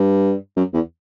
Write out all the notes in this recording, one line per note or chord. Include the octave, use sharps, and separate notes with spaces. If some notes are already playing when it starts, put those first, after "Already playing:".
Already playing: G2
F#2
E2